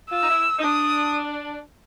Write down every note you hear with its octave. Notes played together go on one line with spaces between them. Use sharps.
F4 E6
D#4
E4
D#4
D4 D#6